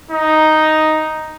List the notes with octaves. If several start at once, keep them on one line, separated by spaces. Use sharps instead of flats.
D#4